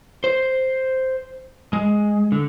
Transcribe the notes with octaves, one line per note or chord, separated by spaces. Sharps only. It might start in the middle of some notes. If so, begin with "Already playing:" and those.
C5
G#3
D3